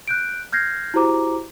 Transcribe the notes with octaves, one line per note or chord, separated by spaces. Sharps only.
F#6 G6 D7
F6 G6 G#6 A#6 C7
E4 F#4 G4 C5 A#5 D6